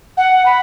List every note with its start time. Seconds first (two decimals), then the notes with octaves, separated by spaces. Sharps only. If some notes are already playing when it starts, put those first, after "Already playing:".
0.17 F#5
0.46 B5